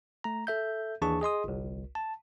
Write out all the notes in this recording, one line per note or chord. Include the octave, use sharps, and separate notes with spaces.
A3 A#5
A4 E5 G6
D#2 E3 D4 G#4 A5 C#6
G#4 D#5 C6 D#6
G1 C2
A5